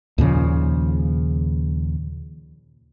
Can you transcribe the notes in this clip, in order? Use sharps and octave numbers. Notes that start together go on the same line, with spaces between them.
D#2 A#2 C#3 F3